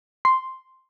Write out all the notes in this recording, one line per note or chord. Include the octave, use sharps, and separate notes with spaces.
C6